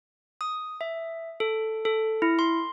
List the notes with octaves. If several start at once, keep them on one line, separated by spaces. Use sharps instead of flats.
D#6
E5
A4
A4
E4
C6